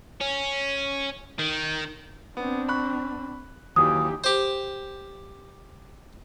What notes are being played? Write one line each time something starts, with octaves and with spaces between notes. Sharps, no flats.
C#4
D#3
B3 C4 D4
B5 C#6 F#6
D#2 E3 F#3 D#4 G4 D#6
G4 C5